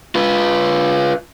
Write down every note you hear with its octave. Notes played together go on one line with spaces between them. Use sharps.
F4 B4